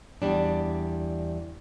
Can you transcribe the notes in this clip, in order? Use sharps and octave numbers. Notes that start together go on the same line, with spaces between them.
E2 G3 D4